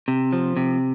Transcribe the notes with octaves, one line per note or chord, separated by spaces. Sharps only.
C3
F3
C3